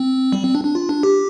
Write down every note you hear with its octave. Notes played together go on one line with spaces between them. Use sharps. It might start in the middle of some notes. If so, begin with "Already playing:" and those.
Already playing: C4
G3
C4
D4
D4
F4
D4
G4